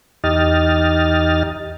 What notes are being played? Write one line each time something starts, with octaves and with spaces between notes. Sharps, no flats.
E2 D#4 G4 D#5 F6 A6